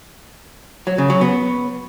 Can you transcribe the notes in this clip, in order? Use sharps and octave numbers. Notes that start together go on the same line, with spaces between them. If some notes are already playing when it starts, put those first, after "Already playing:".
F#3
C#3
F#3
B3